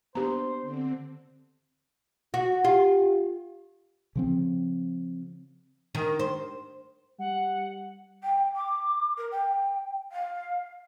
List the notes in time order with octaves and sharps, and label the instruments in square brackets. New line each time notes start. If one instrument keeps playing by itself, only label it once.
[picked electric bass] A#3 B3 D4 [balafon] G4 A#5 [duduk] C5
[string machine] D3 C4
[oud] F#4
[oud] F4 [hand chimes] G4
[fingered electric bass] C#3 F3 C4
[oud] D#3
C5
[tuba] G3 [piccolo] F#5
[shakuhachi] G5
D6
A#4
G5
F5